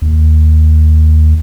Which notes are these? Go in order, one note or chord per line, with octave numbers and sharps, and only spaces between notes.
D#2